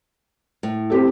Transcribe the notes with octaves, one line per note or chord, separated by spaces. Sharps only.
A2
C4 G4 A4